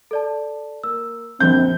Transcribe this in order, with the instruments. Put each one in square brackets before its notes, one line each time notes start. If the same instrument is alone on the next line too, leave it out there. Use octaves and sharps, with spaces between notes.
[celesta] A4 D5 A5
[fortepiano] A#3 [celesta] E6
[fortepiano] A#1 F#2 D3 [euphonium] C4 [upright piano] G6